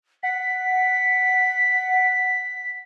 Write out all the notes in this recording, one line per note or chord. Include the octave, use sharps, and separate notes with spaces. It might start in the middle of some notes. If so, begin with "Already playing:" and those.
F#5 B6